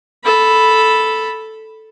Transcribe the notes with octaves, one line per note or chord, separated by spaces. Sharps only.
A4 B5